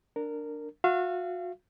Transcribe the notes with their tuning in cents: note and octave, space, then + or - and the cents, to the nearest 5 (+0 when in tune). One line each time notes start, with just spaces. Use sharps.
D4 +5 A#4 -15
F#4 -35 F5 -35